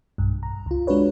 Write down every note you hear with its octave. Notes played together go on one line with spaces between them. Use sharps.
B1 G2
A#5
C#2 F4
G#3 D4 F4 F#4 B4 C#5